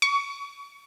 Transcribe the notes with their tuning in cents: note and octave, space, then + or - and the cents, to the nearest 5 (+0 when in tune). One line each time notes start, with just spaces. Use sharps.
C#6 +30